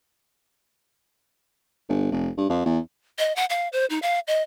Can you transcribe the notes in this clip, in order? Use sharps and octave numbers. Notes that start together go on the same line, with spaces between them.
G1
F1
G2
F2
E2
D#5
F#5
F5
C5
D#4
F5
D#5